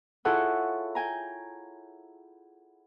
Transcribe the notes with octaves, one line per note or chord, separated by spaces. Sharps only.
E4 F4 G#4 A4 C#5 F#5
G5 G#5 A#5